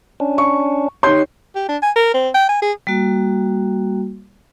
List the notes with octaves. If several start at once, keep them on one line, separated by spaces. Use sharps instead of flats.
C#4 D4
C#6
D#4 G4 C#5 C6 G6
G4
D4
G#5
A#4
C4
G5
G#5
G#4
G3 A#3 F#4